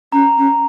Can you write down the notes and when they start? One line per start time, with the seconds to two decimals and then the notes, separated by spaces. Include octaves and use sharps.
0.12 C#4 A#5
0.38 C#4